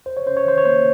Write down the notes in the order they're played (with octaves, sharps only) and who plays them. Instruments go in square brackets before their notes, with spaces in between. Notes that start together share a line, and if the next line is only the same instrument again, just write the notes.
[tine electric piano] D#2 C5
C#5
C#4 C5
C#5
D#3 C5
C#5
A#3 C5